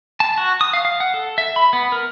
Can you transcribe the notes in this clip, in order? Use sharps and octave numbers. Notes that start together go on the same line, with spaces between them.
A5
F#4
D#6
F5
F5
F#5
A4
E5
B5
B3
A#4